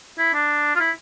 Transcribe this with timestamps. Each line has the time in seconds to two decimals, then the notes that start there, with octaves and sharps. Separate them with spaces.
0.18 E4
0.34 D4
0.75 F4
0.80 E4